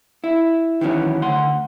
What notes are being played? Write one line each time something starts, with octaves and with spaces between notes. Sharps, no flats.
E4
D#3 E3 F#3 C#4
D2 F#5 C6